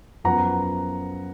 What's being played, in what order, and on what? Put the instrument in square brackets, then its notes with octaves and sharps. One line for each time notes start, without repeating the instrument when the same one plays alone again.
[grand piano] F#2 F3 B3 F#5 A#5